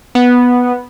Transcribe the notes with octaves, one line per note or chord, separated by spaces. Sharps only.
B3